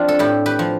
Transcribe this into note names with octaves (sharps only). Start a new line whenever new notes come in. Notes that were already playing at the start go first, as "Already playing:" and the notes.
Already playing: F3 C4 D4 F4
A4
A2 E4 G4
G4 B4
F3